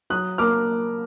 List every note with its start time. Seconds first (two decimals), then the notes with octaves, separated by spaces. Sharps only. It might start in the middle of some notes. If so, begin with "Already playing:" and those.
0.10 F#3 D#6 F#6
0.38 A#3 D6 F6